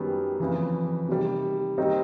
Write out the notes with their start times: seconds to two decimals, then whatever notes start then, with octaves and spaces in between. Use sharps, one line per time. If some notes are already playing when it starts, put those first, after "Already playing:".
Already playing: F#2 D#3 G3 B3
0.40 F2 C#3 E3
1.09 C3 D#3 G3
1.78 D#3 G3 C4 D#4